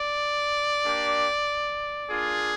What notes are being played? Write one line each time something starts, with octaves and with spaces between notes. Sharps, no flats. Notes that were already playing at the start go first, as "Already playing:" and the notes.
Already playing: D5
A#3 D4 G4
A#3 D4 F4 G#4